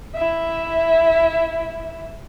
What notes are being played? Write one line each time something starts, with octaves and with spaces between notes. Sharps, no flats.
E4 E5